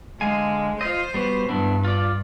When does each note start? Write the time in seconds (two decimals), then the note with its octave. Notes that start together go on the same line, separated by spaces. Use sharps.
0.21 D3 G#3 F5 G#5
0.81 F4 C5 D#5
1.14 G3 B3 F#4
1.49 G2 B3 D4 E4
1.85 F4 D5